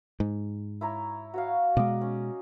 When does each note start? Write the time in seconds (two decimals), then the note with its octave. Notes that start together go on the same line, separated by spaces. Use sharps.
0.20 G#2
0.81 E4 C#5 A#5
1.34 F#4 C#5 F5
1.77 B2 G#3 D5 D#5
2.01 C#4